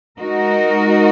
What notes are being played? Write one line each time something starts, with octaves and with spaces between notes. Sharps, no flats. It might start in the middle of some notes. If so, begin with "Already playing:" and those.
G#3 D#4 F#4 A#4 D#5